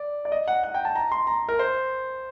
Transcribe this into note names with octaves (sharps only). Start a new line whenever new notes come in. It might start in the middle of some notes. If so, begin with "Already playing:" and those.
Already playing: D5
D5
D#5
F#5
F#5
G5
A5
A#5
C6
A#5
A#4
C5